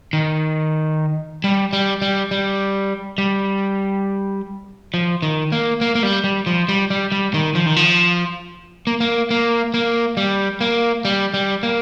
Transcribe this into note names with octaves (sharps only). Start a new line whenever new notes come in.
D#3
G3
G3
G3
G3
G3
F3
D#3
A#3
A#3
A#3
G3
G3
F3
G3
G3
G3
D#3
F3
D#3
F3
A#3
A#3
A#3
A#3
G3
A#3
G3
G3
A#3